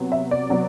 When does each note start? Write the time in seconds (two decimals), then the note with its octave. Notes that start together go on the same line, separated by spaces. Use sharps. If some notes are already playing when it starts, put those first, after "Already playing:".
Already playing: C3 F#3 B3
0.12 E5
0.31 D5
0.49 C3 F#3 B3